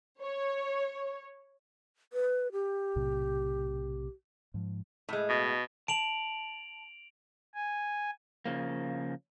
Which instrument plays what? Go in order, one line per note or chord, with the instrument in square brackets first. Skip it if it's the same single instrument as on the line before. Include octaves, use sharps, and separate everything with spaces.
[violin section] C#5
[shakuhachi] B4
G4
[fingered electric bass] B1 A2 C3
G#2 F3
[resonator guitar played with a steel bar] A2 G#3
[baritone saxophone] B2
[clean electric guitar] A5 [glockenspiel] D7 F7 F#7
[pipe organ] G#5
[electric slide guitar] C#3 F3 A#3